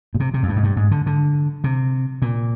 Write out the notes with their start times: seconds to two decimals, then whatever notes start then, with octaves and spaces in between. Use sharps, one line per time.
0.15 A#2
0.20 C3
0.34 C3
0.43 F2
0.48 G2
0.56 G#2
0.63 G2
0.77 G#2
0.91 D3
1.06 D3
1.64 C3
2.22 A#2